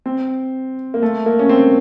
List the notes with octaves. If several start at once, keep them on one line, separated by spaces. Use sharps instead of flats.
C4
A#3
A3
A#3
C#4
C4